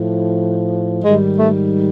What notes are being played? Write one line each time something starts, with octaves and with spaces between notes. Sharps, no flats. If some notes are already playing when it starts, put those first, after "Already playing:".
Already playing: A2 F3
G#2 D#3 G3 G#3
A3